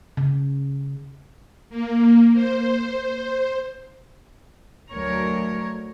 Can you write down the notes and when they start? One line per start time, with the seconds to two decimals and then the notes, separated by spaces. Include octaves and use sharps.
0.17 C#3
1.70 A#3
2.34 C5
4.91 D2 F#3 A#4 C#5